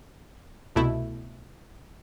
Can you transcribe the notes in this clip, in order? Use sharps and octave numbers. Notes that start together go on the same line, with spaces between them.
C2 B2 A3 E4